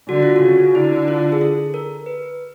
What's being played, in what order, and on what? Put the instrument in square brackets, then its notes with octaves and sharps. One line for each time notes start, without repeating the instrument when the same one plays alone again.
[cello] D3 [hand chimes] F#4
[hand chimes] F4
F#4
[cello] C#3
[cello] D3 [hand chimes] E4
[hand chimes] F4
G#4
A4
A#4
B4